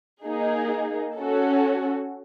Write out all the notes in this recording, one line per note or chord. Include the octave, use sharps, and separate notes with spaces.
A#3 D#4 G#4
C#4 F#4 A4